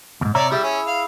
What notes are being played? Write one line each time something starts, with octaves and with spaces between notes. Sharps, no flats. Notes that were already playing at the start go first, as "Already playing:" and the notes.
D#2 G#2
C3 C#5 D5 E5 A#5
G3 E4 G#4 E5
C#4
F5